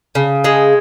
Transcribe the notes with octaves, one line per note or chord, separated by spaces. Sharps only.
C#3
G#3